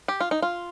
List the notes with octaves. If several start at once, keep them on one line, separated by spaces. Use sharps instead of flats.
G4
F4
D#4
F4